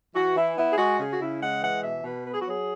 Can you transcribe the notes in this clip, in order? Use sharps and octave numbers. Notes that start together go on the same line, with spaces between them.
E3 F#4
E3 E4
B3 E4
G#4
G#3 F#4
C#3 G#4
F#4
C#3 E4
G#3 F#5
E3 F#5
B2 E5
B2 B4
B3 B4
G#4
F#4
F#3 G#4